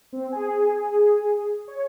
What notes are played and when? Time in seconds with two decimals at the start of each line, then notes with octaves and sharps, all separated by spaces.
0.13 C4
0.32 G#4
1.68 C#5